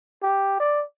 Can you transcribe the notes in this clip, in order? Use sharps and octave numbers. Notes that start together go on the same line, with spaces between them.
G4
D5